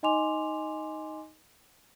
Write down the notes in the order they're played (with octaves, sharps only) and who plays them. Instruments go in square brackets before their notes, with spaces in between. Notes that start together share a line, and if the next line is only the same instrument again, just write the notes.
[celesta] D#4 D#5 G#5 C6 D6 F7